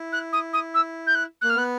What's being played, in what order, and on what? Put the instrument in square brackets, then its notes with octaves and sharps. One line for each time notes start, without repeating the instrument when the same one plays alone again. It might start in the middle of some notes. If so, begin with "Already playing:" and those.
Already playing: [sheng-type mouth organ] E4
[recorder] F#6
D#6
D#6
E6
G6
F#6
[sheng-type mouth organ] A#3 [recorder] F#6
[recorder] F6
[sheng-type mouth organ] B3 [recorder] F#6